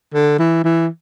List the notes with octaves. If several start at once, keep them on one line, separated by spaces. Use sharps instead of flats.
D3
E3
E3